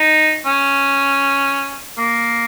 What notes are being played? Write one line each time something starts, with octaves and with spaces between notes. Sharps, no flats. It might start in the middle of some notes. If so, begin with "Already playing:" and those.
Already playing: D#4
C#4
A#3